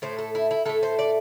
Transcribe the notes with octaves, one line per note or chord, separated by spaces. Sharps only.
A2 A3 C5
A4
E4
E4
A2 A3 A4
C5
D5